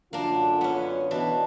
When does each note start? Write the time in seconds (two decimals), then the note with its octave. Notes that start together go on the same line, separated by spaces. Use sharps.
0.13 F#2 D3 A#3 D4 F4
0.61 B3 C#4
1.11 B2 E3 D4